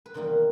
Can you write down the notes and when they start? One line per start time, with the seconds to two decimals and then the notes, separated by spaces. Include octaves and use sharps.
0.06 B4
0.14 E2 C3 D#3 G3 A#3 A#4